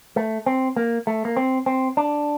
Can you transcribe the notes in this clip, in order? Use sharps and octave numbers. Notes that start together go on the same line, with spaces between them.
A3
C4
A#3
A3
A#3
C4
C4
D4